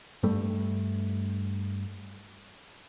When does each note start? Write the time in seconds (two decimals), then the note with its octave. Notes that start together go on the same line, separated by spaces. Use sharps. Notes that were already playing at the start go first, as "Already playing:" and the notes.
0.23 G2 G3 A3